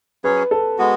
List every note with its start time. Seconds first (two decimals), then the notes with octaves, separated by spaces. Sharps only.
0.24 F#3 C#4 G#4 B4 C#5
0.51 A4
0.78 G#3 B3 F#4